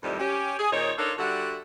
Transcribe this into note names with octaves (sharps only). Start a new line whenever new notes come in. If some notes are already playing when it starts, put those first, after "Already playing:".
F2 A2 C3 D#3 G3
C#4 G4
G#4
A#2 D#3 D#4 C5 C#5
D4 D#4 F4 A4 A#4 C#5
D3 G3 F#4 E5 F#5